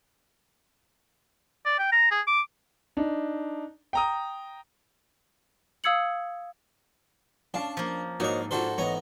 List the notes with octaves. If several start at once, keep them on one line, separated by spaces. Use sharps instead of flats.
D5
G5
A#5
G#4
D6
D4 D#4
G5 A#5 D#6
F5 D#6 E6 G#6 C#7 F#7
C#4 D4 F5 A5
F3 A#3
G#2 A#3 F#4 A#4 C#5 D#5
D4 F4 F#4 A4 C5
A1 B3 C#5 D#5 A#5